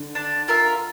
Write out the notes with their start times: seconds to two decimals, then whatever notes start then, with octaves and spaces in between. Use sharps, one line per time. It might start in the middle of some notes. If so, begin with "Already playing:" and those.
Already playing: D3
0.15 D4
0.48 F4 A#4 E5